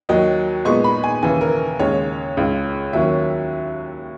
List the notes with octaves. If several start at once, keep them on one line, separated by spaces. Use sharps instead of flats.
D#2 D#3 F#3 D#5
A#2 G#3 B3 D#4 C#6
B5
G#5
D#2 C#3 E3 G#5
A#4
D#2 C#3 G#3 C#5
C#2 C#3 G#3
D#2 D#3 F#3 A#3 C#4 E5